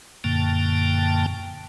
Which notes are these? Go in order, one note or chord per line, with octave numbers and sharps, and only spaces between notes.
F#2 A#2 D3 A#3 G5 A5